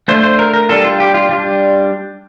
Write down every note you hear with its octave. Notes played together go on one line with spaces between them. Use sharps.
A3 D4 F4 C5
C5
A#4
A#4
G3 D4 F4 A4
F4
G4
F4
G3 D4 F4